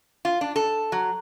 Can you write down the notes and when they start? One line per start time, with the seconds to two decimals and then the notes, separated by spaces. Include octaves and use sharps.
0.25 F4
0.41 D4
0.56 A4
0.92 F#3